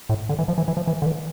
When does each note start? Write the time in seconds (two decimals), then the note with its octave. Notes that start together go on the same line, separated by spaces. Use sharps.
0.09 A2
0.29 D3
0.39 E3
0.48 F3
0.58 E3
0.68 E3
0.77 F3
0.87 E3
1.02 D3
1.06 E3